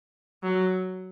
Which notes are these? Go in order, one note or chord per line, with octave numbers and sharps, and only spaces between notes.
F#3